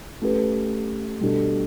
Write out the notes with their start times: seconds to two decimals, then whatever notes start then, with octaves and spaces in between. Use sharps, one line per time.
0.22 A3 C#4 G4 B4
1.21 B2 G3 D4 A4